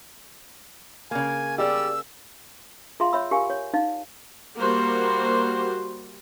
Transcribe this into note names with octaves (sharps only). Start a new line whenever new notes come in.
C#3 A#3 G#5
G3 G4 G#4 D5 E6
F4 G#4 E5 F5 A#5 C6
C#5 E5 B5 E6
G4 A#4 F5 G#5
C#5
D#4 D5 F5
G3 A#3 F#4 C5